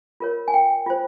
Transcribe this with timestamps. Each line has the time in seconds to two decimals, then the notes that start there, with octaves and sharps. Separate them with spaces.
0.20 F4 A#4 C#5
0.48 G#5
0.54 G5
0.86 F4 C5